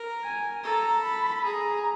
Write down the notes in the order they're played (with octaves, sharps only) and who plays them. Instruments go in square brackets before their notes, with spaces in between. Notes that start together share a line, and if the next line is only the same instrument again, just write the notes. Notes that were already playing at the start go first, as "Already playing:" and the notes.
Already playing: [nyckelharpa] A#4
[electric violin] G#5
[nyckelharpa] A4 [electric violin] A#5
[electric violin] B5
[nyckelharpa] G#4 [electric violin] A#5